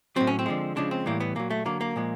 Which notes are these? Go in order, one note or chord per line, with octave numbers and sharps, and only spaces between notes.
A2 F#3 C4
C#4
C4
D3 F3 G#3
C#3 F3 G#3 D4
C4
A2 E3 G3 A#3
B3
A#2 F#3 A#3
A3
D3 F#3 A#3
A#3
A#2 F3 G#3